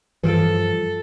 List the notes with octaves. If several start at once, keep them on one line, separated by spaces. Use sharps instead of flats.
G2 E3 F3 A4 D7